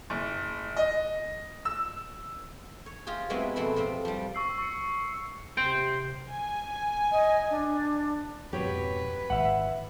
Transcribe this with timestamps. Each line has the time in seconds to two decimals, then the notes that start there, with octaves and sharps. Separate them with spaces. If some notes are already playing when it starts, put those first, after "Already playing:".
0.10 F#1
0.76 D#5
1.65 E6
2.86 C#5
3.07 F4 G4 G#4 C5
3.30 F#3 G#3 B3 C4 E4 F#4
3.56 F2 B2 C4 A4 E5 B5
3.76 C3 F3 C4
4.05 F3 G3
4.35 C#6 E6 C7
4.58 C#6 C#7
5.57 C3 C5 G5
6.29 G#5
7.12 D#5
7.50 D4
8.53 F2 G#2 B2 F#3 G4 B4 C#5
9.30 G#1 G#2 E3 E5 F#5